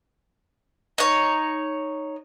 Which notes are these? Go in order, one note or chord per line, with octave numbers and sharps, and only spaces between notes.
D#4 C#5